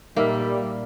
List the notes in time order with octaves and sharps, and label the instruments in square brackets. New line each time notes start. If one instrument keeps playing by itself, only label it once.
[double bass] A#2 [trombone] G3 [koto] A#3 [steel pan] D#4 A#4 E5